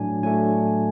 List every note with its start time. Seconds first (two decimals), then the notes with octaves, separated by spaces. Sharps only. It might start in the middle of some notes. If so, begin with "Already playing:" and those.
Already playing: A2 F#3 A3 D4 G#5
0.23 A2 F#3 A3 D4 G#5